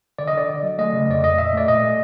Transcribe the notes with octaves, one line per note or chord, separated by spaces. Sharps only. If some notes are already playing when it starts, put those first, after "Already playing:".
D3 D5
D#5
D3 D5
D3
F#3
A3 D#5
C#3
F2 D5
F2 D#5
A#2 E5
A3 D5
A#2 D#5
A3